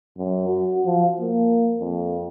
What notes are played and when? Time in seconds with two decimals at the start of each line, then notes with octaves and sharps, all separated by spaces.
0.18 F#2
0.48 F#4
0.86 F3
1.21 A#3
1.79 F2